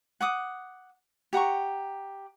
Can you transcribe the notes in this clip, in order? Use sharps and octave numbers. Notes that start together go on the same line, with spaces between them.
F#5 D6 D#6
G4 F#5 A#5 C#6